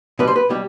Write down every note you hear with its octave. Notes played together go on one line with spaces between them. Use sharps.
B2 G3 B4
C5
B4
B2 G3 G4